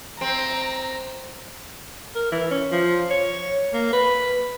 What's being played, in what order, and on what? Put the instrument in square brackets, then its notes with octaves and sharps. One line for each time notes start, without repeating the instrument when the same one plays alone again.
[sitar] C4 [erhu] A#5
[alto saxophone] A#4
E3
C#4
F3
C#5
A#3
B4